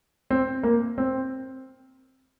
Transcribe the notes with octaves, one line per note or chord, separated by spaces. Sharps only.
C4
A#3
C4